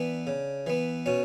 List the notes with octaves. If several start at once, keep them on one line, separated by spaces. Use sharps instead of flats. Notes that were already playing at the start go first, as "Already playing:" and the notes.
Already playing: E3 B3 D4
C#3
E3 B3
B2 C#4